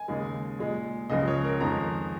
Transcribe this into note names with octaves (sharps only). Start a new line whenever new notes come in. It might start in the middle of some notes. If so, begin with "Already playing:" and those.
Already playing: G#5
D#2 C#3 G#3
A#2 G#3
C#2 C#3 F3 G#3 D#5
C#5
A#4
F2 D#3 G#3 A#5